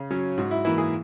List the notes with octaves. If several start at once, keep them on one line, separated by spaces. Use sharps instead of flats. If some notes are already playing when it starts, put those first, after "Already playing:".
Already playing: C#3
F#3 C#4
G#2 F#4
E4
E3 A#3 E4
G#4